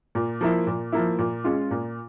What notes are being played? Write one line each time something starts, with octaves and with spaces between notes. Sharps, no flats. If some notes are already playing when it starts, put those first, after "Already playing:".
A#2
F3 A#3 E4
A#2
F3 A#3 E4
A#2
G#3 C#4 F4
A#2